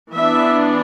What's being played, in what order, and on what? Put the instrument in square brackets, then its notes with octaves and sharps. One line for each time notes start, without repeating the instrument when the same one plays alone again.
[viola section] E3 B3 D4 E5